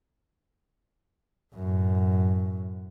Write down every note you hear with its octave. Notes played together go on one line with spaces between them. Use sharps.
F#2 A2